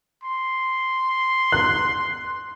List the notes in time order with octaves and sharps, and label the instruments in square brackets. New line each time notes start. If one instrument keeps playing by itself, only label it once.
[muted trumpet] C6
[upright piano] F#6